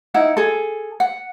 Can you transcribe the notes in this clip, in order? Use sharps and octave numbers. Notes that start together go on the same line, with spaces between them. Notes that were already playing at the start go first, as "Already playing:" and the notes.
D#4 E4 F#5
G#4 A4
F#5